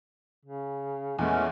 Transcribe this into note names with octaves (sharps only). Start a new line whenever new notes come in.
C#3
E2 A#2 G#3 A3 B3 C#4